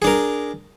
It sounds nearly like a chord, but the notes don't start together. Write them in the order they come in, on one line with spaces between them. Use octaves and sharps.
G#4 D4 A#4